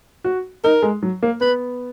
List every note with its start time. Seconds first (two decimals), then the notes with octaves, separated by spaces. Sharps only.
0.24 F#4
0.64 D#4 A#4
0.83 G#3
1.03 F#3
1.23 A#3
1.41 B3 B4